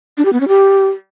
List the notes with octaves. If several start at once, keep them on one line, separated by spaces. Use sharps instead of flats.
D4
G4
B3
C#4
G4